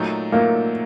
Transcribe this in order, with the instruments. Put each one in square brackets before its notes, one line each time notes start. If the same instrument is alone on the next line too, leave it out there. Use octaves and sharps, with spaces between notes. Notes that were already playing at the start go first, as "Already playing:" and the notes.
Already playing: [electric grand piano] A#2 F#3 A3 D#4
[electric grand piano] A#2 F#3 A3 D#4 [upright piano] A#3